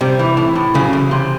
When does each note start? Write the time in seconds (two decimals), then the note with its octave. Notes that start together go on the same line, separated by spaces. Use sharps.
0.01 C3 G3
0.19 E3
0.37 A2
0.55 A2
0.74 C#3 F#3
0.93 E2
1.11 C3